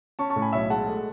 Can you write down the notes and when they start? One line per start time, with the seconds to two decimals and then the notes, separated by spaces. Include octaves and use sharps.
0.19 C#4 A5 C#6
0.30 A5 C#6
0.36 A2
0.42 G#5 B5
0.53 B1 C#5 E5
0.70 G#3 F#5 A5
0.88 A3